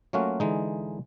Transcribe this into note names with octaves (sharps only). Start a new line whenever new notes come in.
F#3 A3 A#3 C#4 F4 F#4
D3 E3 G#3 D#4